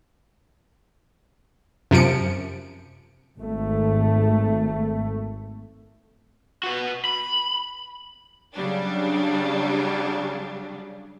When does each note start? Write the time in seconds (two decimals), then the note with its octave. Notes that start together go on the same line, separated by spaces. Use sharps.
1.91 F#2 C3 F3 C#7 D7
3.39 G#1 A3
6.63 F#4 B4
7.05 B5
8.56 C#3 F#3 G3 D4